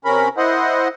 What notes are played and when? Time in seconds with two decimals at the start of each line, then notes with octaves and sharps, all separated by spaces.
0.05 C3 C#4 A#4 B5
0.37 E4 C5 D#5 F#5